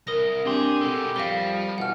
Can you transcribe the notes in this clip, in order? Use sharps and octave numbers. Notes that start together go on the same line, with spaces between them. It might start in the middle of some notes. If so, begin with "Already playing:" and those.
C2 A#4 D#6 A#6
C4 D4 G4 G#4 C6
B2 G#3 A4
F2 F3 G3 F5 A#6 G7
B2 E3 F#5 F6